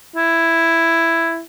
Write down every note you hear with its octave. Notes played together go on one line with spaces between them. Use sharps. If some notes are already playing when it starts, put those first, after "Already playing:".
E4